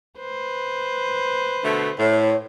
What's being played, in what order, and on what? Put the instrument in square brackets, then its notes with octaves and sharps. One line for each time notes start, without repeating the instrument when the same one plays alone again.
[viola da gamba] B4 C5
[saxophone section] B2 D3 A3
[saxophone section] A2 [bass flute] C#5